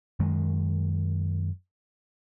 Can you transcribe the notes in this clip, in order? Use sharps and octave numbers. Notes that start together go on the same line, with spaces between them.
F#2 D#3 G#3